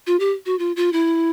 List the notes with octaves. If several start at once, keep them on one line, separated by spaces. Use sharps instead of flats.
F4
G4
F#4
F4
F4
E4